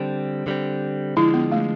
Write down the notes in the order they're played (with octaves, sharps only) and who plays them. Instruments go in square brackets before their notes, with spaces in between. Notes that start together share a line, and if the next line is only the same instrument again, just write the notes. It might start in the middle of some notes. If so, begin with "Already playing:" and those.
Already playing: [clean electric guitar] D3 G3 C4
D3 G3 C4
[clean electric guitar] D3 F3 G#3 [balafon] E4
[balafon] B3
A3